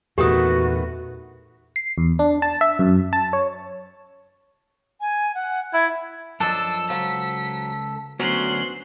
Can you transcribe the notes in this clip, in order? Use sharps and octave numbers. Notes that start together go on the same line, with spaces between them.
E2 A#2 D#3 A3 B3 F#4 G4 D#6
C7
E2
D4
A5
E5
F#2
A5
C#5
G#5
F#5
E4 G#6
F#2 F3 D4 A4 D#5 E6
C#2 F#3 C5 F5 B6
D2 F#3 B3 C#4 F#4 C5 C6 F#6